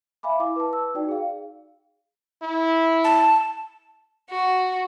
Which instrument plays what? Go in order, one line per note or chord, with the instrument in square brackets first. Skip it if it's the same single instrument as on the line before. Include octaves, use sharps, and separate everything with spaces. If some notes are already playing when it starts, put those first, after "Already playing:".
[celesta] E5 F5 G#5 B5 D6
E4 D6
B4 A5
E6
D#4 F#4 D5 G5
G#4 F5
[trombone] E4
[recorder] A5
[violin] F#4